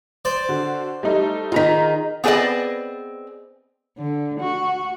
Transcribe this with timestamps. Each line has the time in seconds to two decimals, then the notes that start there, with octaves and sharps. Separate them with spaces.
0.25 C5 D5
0.49 D3 F#4
1.03 G3 A3 D#4
1.52 D#3 F4 G#4 A#5 B6
2.24 B3 C4 G#4 B4 D5 D#5
3.97 D3
4.40 F#4